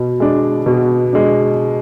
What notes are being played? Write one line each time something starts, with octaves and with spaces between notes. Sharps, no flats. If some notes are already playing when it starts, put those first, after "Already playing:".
Already playing: B2
G#3 D4
B2
G#3 D4